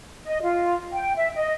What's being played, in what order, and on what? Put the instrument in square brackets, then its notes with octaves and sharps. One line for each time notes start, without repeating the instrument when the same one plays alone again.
[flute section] D#5
F4
G5
E5
D#5